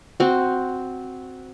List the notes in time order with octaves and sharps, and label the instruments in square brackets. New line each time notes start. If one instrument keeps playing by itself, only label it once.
[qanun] C4 F#4